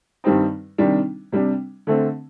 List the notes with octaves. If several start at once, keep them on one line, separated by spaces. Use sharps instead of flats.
G2 D#3 G3 C4 D#4
C3 D#3 G3 D4
C3 G3 D4
D3 A3 C4